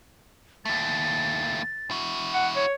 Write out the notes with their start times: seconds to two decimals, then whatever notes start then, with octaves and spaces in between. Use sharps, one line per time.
0.65 D#2 A3 A6
1.91 E4 F#4
2.34 F#5
2.56 C#5